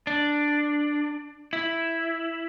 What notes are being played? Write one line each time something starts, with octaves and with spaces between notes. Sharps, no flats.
D4
E4